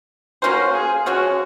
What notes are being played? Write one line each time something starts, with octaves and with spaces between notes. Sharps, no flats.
A#3 C#4 F4 F#4 C5
G#4
F3 G#3 C#4 F#4